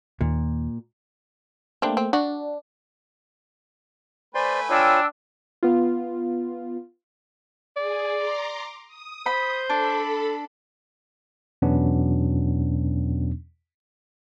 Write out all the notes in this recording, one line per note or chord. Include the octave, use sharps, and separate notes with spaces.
D#2 A#2
G3 A3 A#3 C4 D4
C4
D4 F#4
A3 B4 C5 D5 G#5 C6
D4 F4 C#5 G5 E6
B3 F4
G#4 D5
A#5 C6 D6
D#6
C5 B5
D4 A4 B5
E2 B2 F#3 B3 C#4 D4